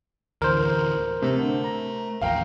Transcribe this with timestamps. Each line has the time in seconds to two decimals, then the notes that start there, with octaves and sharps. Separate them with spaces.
0.42 D2 A2 E3 A#4 C5
1.22 C3 A3
1.39 D3
1.64 A#5
2.21 A1 D#2 F3 F5 G5 A#5